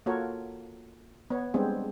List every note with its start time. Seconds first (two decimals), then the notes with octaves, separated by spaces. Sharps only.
0.06 A#3 F4 F#4 A4 A#4 C#5
1.30 B3 C#5
1.54 G3 G#3 B3 C4 D4 G#4